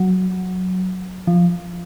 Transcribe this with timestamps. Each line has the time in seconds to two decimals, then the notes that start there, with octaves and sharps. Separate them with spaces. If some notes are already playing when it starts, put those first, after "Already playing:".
Already playing: F#3
1.27 F3